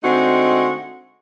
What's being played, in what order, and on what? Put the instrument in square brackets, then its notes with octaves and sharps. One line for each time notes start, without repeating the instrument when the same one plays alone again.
[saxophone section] D3 G#3 A3 C4 D#4 F#4